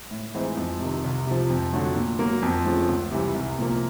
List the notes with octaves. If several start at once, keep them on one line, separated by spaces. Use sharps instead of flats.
A2
E3 G#3 C4 D#4
F2
C3 D#3
C2
C3 F3
F2
D3 F#3 A3
A#2
F#3 A#3
F2
C#3 F3 A3
C#2
C3 E3 G3
C2
A#2 F3 A#3